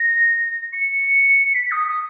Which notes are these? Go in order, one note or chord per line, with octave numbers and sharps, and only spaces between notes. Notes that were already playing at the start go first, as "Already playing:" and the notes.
Already playing: A#6
C#7
B6
D#6
D#6